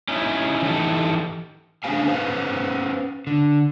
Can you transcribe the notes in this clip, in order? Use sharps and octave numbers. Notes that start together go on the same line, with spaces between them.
C#4 D#4 E4
E3 D#4 G4 A4
A3 C#4 D4 C5 F5 G#5
C#4 B4 C5 F5
D3